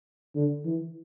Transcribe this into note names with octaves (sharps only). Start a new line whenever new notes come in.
D3
E3